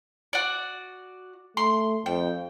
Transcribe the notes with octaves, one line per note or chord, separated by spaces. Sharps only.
F#4 D5
A3 C6
F2 G5